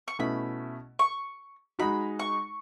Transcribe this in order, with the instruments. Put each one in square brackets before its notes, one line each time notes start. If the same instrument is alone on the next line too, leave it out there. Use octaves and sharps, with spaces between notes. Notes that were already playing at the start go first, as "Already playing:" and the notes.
[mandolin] C#6
[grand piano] B2 A3 C#4 E4 [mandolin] B5
[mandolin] C#6
[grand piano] G#3 D#4 F#4 [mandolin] B5
[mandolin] C#6